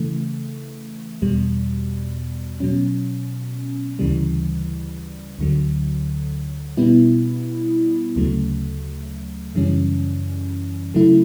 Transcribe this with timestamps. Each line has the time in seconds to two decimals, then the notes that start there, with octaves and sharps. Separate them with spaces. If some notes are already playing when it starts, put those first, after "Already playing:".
Already playing: C#3 E3 A3
1.22 E2 B2 G3
2.60 B2 F#3 C#4
3.99 D2 C#3 E3 G3
5.39 D2 D3 F#3
6.77 B2 G3 B3 E4
8.16 D2 C#3 F#3 A3
9.55 F#2 C#3 E3 G3 C#4
10.94 C#3 F#3 A3 E4